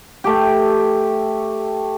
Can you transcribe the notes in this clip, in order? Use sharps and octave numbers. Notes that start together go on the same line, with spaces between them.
A3 G4